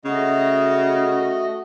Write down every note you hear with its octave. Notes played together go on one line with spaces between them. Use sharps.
C#3 A3 F#4 D#5